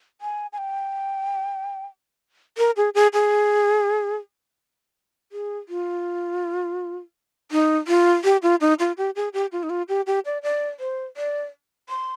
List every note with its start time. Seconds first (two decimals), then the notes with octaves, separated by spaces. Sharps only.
0.21 G#5
0.53 G#5
0.58 G5
2.58 A#4
2.77 G#4
2.95 G#4
3.13 G#4
5.32 G#4
5.69 F4
7.52 D#4
7.88 F4
8.24 G4
8.43 F4
8.61 D#4
8.80 F4
8.98 G4
9.16 G#4
9.34 G4
9.52 F4
9.63 D#4
9.70 F4
9.89 G4
10.07 G4
10.25 D5
10.43 D5
10.80 C5
11.17 D5
11.89 C6